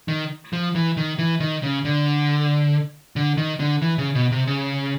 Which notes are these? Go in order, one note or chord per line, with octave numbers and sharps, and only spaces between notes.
D#3
F3
E3
D#3
E3
D#3
C#3
D3
D3
D#3
D3
E3
C#3
B2
C3
C#3